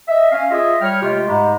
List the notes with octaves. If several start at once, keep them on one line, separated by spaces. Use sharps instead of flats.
D#5 E5
C#4 F5
F4 G#4 D#5 E5
G3 C#5 G5 F6
C3 G#3 A3 F4 G4
G#2 G#3 G4 A#5 B5